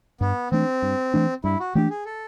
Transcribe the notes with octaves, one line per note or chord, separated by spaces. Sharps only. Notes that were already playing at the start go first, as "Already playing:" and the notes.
G2 B3
E3 A3 C4 D4
G2
E3 A3 D4
G2 E4
F#4
E3 A3 D4 G4
G#4
A4